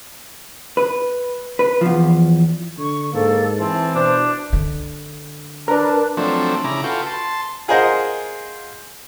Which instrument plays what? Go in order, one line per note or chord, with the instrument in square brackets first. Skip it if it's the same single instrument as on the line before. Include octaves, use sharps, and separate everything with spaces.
[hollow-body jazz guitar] B4
B4
E2 F3
[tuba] D3 [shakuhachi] C#6
[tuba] G#2 [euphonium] A#3 [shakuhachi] A4
[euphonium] E3 [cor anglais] C4 [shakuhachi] A5
[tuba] B2 [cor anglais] D4 [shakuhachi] C5
[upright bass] D3
[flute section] D4 A5 F#6 [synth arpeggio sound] A#4 B4
[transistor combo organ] F3 F#3 A3 C4 D4
C#3 E4 A#5 D6
F4 F#4 A4 B4 G5
A5 C6
[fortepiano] F4 G#4 A#4 C5 D#5 F#5